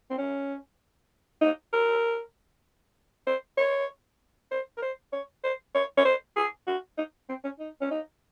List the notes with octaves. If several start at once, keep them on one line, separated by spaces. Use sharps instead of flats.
C4
C#4
D#4
A#4
C5
C#5
C5
A#4
C5
C#5
C5
C#5
C#5
C5
G#4
F#4
D#4
C4
C#4
D#4
C#4
D#4